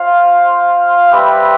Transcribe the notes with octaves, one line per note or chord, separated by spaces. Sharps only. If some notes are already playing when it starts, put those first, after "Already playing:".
Already playing: F4 C5 F5
G3 C4 G4 B4 E5